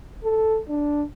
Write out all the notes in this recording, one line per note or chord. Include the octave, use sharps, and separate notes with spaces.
A4
D4